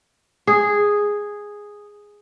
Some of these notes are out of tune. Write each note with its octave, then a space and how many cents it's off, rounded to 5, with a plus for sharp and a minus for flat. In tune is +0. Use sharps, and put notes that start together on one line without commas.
G#4 -5